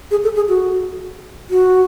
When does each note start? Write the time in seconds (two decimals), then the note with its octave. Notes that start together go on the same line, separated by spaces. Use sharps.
0.11 G#4
0.24 A4
0.35 G#4
0.48 F#4
1.50 F#4